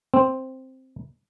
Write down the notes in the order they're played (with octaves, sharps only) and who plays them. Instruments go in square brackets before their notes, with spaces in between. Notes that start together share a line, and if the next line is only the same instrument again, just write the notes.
[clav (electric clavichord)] C4